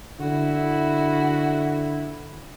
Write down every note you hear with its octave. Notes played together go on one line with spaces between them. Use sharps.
D3 E4 F#4